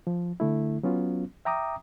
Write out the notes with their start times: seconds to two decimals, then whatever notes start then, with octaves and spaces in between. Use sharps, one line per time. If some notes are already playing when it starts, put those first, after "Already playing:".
0.07 F3
0.40 D3 A3 E4
0.83 F#3 B3 C#4 F4
1.45 E5 G5 A#5 D6 D#6